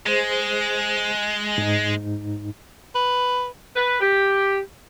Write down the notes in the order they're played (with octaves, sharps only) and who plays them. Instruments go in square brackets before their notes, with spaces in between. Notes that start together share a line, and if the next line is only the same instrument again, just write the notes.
[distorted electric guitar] G#3 [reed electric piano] G#4 C5
[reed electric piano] G#2 D#4
[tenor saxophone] B4
[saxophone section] B4
G4